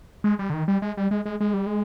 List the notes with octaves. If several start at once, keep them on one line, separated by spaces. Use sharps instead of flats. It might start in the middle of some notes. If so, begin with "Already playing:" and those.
G#3
G3
D3
D#3
G3
G#3
G3
G#3
G#3
G#3
G3
G#3